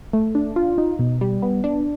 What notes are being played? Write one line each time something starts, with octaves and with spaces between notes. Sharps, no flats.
A3
D4
F4
D#4
B2
G3
B3
D4